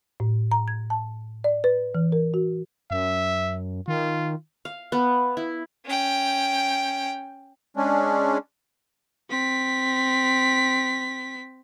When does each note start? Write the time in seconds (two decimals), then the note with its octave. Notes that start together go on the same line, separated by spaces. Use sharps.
0.20 A2
0.52 A#5
0.68 G#6
0.90 A5
1.44 D5
1.64 B4
1.95 E3
2.12 A#4
2.34 F#4
2.91 F#2 E5
3.88 D#3 F4
4.65 F5
4.92 B3
5.37 E4
5.86 C#4 G5
7.77 G#3 C#4 D4
9.30 C4 B6